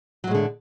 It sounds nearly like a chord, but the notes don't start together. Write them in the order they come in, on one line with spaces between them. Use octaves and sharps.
F#3 A2 G#3 D3